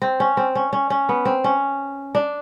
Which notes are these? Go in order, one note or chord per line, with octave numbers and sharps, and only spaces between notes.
C4
C#4
C4
C#4
C#4
C#4
B3
C4
C#4
D4